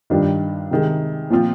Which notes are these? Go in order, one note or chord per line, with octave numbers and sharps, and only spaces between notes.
G2 D#3 G3 D4 F4
C3 D#3 G#3
A#2 F3 C4 F4